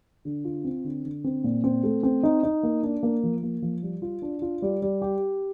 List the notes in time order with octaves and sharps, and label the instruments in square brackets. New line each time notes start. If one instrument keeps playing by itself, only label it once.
[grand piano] D3
F4
C4
D3
D3
C4
A#2
C4
A3
C4
D#4
D#4
A#3
D4
A#3
F3
A#3
F3
G3
F4
D4
F4
G3
G3
G4